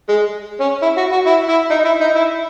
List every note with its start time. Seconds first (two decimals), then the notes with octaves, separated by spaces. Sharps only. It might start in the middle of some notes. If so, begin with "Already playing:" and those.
0.09 G#3
0.60 C#4
0.83 E4
0.97 F#4
1.12 F#4
1.26 E4
1.49 E4
1.71 D#4
1.85 E4
2.01 D#4
2.15 E4